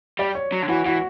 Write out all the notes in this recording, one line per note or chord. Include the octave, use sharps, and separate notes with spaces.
G3 D5
C#5
F#3
D3
E3 F#4
E3 F#4